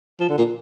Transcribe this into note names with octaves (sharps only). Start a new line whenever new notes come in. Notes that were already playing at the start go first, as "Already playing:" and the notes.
F3
D3
A#2